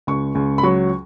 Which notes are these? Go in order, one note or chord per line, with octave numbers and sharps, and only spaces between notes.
C#2 C#6
C#2
B5
F#3 C#6